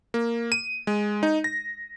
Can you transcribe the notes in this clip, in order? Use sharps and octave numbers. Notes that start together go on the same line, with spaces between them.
A#3
D#7
G#3
D#4
A#6